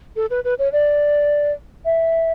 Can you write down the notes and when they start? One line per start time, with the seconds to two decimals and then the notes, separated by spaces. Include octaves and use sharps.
0.16 A4
0.30 B4
0.44 B4
0.59 C#5
0.73 D5
1.85 E5